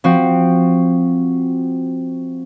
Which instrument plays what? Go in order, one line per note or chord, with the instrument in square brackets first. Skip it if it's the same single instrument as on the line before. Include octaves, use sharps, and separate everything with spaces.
[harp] F3 C4 F#4